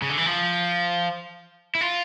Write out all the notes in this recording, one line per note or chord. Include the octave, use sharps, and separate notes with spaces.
C#3
D3
E3
F3
E4
F4